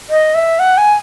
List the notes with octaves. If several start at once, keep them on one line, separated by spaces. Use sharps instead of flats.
D#5
E5
F#5
G#5